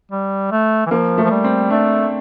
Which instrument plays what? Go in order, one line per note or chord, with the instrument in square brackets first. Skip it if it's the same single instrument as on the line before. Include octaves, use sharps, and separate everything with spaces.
[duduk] G3
A3
E3
[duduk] F3 [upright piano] A#3
[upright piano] A3
[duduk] F3
G3
[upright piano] C4
[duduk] A3 [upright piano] D4